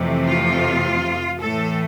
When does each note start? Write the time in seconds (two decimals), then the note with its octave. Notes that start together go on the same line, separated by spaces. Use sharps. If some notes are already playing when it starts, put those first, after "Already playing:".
Already playing: F2 C3 E3 A3
0.27 F4
1.40 A2 E3 A3 A4